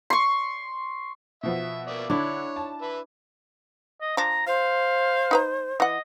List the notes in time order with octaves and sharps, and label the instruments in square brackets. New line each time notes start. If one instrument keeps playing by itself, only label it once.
[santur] C6 C#6
[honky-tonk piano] B2 F3 B3 [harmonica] E5
[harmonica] A#3 D5 E5
[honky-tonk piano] D3 [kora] D4 E4 [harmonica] C#5
[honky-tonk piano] A5
[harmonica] B4 E5
[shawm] D#5
[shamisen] F3 D4 [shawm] A#5
[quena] C5 [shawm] F5
[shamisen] D#4 B4 A#5
[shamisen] E3 F#5 [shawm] D#5